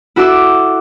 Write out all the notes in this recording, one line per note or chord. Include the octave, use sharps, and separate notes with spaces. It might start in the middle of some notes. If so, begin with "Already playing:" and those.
E4 F#4 A4 D6 E6